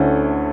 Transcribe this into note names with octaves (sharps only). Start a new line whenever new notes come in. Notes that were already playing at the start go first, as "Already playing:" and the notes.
Already playing: D2 D3 A3 C#4 E4